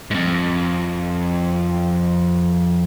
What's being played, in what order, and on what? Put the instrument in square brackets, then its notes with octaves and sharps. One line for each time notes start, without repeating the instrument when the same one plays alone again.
[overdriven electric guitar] F2 G#2